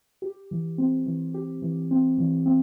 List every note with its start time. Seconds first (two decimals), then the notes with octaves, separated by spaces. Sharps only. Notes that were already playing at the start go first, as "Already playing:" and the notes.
0.22 G4
0.51 E3
0.78 C4
1.06 E3
1.34 G4
1.62 E3
1.91 C4
2.18 E3
2.46 C4